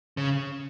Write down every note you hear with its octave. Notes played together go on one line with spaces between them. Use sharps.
C#3